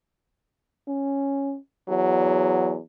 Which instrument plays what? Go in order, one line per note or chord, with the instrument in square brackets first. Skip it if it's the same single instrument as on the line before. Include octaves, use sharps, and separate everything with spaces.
[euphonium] C#4
[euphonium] E2 [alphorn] F#3